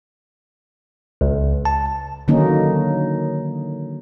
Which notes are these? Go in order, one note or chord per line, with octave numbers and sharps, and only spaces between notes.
C#2
A5
D3 D#3 F#3 A#3 C#4 D#4